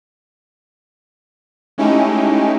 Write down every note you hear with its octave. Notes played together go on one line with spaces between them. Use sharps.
G#3 A3 C#4 D#4 E4 G4